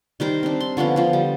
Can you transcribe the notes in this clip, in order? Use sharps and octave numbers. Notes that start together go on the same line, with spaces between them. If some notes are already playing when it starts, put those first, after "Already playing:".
D#3 G3 A#4 C5
C4 D4
C6
D3 F3 B3 C#4
D3 F3
G3